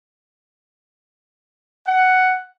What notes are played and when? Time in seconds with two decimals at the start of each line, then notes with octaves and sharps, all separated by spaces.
1.86 F#5